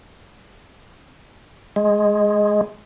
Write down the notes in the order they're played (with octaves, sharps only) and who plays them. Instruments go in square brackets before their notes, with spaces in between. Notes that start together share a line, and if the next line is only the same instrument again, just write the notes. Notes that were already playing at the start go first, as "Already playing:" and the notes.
[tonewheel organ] G#3